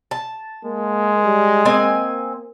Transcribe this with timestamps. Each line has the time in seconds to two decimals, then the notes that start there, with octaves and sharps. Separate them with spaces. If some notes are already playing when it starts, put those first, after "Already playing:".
0.11 A5
0.65 G#3 A#3
1.25 G3
1.65 A#3 C4 D#5 G#5